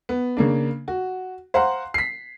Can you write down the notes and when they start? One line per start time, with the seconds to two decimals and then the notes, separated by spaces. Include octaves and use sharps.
0.09 B3
0.37 C#3 A#3 D4
0.88 F#4
1.54 C5 F5 F#5 A#5 C6
1.94 B6 C7